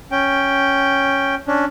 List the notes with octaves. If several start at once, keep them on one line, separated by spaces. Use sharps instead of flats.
C#4 G5
C#4 D4